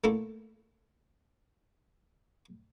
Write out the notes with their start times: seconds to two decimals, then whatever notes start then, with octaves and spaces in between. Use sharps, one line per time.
0.04 A3 A#3 D4 E4 A4 F#5